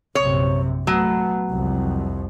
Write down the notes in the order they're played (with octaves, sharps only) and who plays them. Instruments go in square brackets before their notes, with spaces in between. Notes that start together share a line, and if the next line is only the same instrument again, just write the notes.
[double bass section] A#1 F#2 C3 [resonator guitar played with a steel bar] C#5
[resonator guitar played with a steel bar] F#3 [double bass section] A3 B3
[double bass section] C2 F2